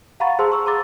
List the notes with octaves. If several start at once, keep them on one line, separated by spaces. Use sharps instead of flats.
F5 F#5 A#5 B5 C#6 A6
G#4 C5 A5 C6 E6
C#6 E6
A#5 C6 D6 A6